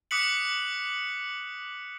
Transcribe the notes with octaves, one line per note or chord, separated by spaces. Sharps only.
D6 D#6 F#6 B6 C#7 F#7